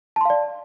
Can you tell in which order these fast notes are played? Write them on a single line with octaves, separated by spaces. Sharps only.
A5 C6 F5 D5